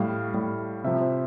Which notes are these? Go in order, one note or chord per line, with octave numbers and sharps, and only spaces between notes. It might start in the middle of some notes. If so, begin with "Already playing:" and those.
Already playing: A2 G3 F5
A2 G3
C3 F3 E5
C5